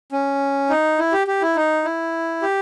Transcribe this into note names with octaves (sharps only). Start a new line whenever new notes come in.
C#4
D#4
E4
G4
G4
E4
D#4
E4
G4